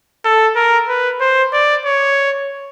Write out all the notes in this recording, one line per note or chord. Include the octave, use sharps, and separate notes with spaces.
A4
A#4
B4
C5
D5
C#5